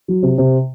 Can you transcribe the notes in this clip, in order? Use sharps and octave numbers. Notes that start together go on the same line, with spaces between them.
F#3
C3
C3